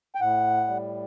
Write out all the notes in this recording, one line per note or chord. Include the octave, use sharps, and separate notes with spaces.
G5
A2 F#5
G3